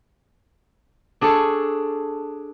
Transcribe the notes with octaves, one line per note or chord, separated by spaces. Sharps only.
D4 G#4 A4 C#5